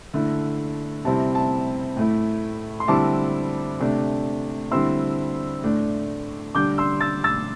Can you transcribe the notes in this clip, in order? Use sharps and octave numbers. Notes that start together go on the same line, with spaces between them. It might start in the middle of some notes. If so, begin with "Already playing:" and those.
D3 A3 E4
C3 G3 C4 E4 A5
A5
A2 A3 E4
C6
D3 G3 C4 E4 A5 D6
C3 A3 D4
D3 G3 C4 E4 C6 E6
A2 A3 D4
D3 G3 D4 D6 G6
C6 E6
E6 A6
E6 A6